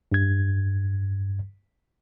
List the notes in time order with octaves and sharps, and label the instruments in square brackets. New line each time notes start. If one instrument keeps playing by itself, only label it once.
[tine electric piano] G2 G#6